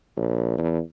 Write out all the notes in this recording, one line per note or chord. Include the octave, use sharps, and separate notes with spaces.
A#1
E2